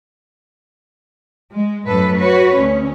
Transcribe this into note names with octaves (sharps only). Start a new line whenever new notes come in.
G#3
F#2 A2 A4 B4
F#4 B4 C#5
D2 C#4